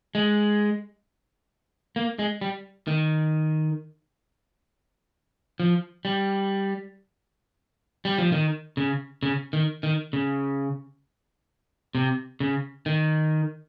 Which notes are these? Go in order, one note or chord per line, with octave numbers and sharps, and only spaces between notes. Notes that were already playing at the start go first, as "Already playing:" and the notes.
G#3
A#3
G#3
G3
D#3
F3
G3
G3
F3
D#3
C#3
C#3
D#3
D#3
C#3
C3
C#3
D#3